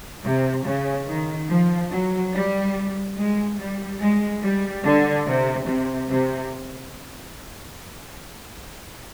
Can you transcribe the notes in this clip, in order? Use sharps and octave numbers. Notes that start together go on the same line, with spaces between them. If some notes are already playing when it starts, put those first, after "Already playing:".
C3
C#3
D#3
F3
F#3
G3
G#3
G3
G#3
G3
D3
C3
C3
C3